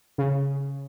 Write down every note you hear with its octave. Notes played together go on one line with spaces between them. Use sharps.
C#3